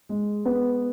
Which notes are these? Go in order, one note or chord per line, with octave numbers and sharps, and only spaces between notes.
G#3
B3